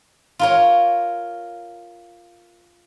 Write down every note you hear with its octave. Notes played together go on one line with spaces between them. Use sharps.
F4 A#4 C#5